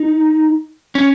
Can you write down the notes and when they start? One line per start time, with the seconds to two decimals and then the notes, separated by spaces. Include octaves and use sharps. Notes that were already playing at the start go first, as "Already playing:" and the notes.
Already playing: D#4
0.95 C#4